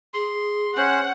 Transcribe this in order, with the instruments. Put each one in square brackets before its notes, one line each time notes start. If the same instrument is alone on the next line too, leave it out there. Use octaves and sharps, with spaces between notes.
[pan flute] G#4 [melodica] C6
[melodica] C#4 C5 [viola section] F#5